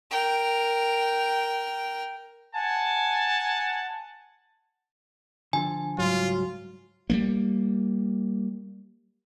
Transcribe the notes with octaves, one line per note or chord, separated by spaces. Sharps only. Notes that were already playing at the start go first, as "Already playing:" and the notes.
A#4 G5
F#5 G#5 A5
D3 F3 A4 G#5
C#2 G#2 F#3 G3 F4
G3 G#3 A#3